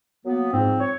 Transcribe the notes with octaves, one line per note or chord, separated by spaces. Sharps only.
F#3 A#3 B3
G#2 F3 G3 C4
C#5